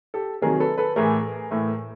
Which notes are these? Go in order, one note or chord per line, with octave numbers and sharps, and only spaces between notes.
G4 A4
C3 D#3 F#3 G#4 A#4
A4 B4
A4 B4
A2 E3 A3 G#4 A#4
A2 E3 A3